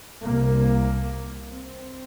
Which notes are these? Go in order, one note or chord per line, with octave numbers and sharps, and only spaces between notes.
C2 C3 A#3
C4